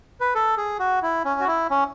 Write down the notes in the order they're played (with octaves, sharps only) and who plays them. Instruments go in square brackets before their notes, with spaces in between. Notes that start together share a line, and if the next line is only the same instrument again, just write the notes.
[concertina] B4
A4
G#4
F#4
E4
C#4
F#4
E4
C#4